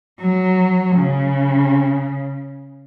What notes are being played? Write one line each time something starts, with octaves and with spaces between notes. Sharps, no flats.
F#3
C#3